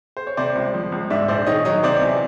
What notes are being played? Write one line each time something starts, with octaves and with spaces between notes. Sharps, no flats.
C5
C#5
C3 C5 D5
C#2
F3
C#2
G#2 D5 E5
A#1 C5 D5
D#3 C#5 D#5
F#3 C#5 D#5
C3 C5 D5
E2